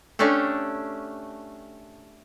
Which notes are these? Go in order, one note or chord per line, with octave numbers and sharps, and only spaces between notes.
A3 C#4 D4 G4 A4